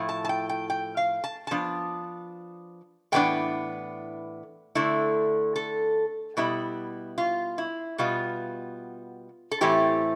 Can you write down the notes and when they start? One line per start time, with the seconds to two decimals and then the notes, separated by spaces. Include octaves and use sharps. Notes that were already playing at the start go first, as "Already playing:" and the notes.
Already playing: A2 F3 E4
0.09 A5
0.25 A5
0.29 G5
0.49 G5
0.70 G5
0.97 F5
1.24 A5
1.47 F3 B3 D4 A5
3.12 A2 E3 B3 D4 G5
4.75 D3 A3 E4
5.56 A4
6.37 B2 G3 B3 E4
7.18 F4
7.58 E4
7.98 B2 G3 B3 F4
9.51 A4
9.61 A2 E3 A3 C4 E4 G4